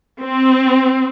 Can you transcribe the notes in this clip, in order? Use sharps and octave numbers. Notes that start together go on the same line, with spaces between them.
C4